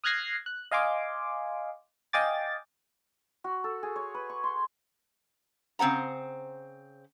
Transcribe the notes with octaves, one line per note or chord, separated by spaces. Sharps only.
D#6 F6 F#6 G#6 A#6 C7
F#6
D#5 F5 G#5 C6 D6
D#5 F5 G5 G#5 D6 A6
F#4
A4
G#4
C#5
B4
C#6
C6
C#3 C4 C5 F#5 A#5